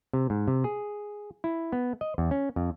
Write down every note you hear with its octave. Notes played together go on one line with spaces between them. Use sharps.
C3
G#2
C3
G#4
E4
B3
D#5
E2
C#4
F2